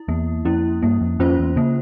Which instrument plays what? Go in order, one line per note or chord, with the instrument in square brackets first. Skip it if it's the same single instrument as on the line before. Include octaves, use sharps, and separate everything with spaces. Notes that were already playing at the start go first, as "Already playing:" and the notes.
Already playing: [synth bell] E4
[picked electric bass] E2 [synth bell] A#3
[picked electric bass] F2 [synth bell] C#4 E4
[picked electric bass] G2 [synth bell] A#3
[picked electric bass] F2
[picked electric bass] F2 [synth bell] C#4 F4 C5
[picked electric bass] E2
[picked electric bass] C#3 [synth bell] A#3